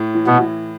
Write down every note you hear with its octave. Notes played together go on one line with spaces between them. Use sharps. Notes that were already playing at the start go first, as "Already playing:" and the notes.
Already playing: A2
E3
B2 B3
E3